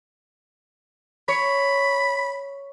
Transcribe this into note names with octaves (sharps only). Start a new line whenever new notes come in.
C#5 B5